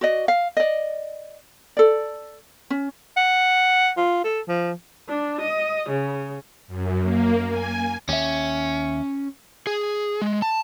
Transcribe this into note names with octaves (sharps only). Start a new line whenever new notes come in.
F#4 D5 D#5
F5
D5 D#5
A4 D5
C#4
F#5
F4
A4
F3
D4
D#5
C#3
F#2
A#3
G#5
D#2 C#4 E5
G#4
G#3
A5